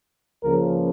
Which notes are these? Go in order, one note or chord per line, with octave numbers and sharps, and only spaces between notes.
C#2 C#3 F3 A#3 A#4